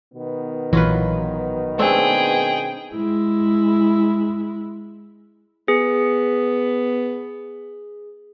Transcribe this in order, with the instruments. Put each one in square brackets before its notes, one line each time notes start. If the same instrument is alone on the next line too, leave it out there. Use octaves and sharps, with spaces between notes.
[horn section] B2 D#3 B3
[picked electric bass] A#1 E3 [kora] F#3 F4 B4
[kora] A3 C4 D4 [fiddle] G#4 G5
[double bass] G#3 E4
[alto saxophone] B3 [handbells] G#4